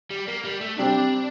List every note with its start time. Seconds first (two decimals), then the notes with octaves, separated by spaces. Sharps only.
0.11 G3
0.28 A#3
0.45 G3
0.61 A3
0.78 C3 G3 C4 D4 G4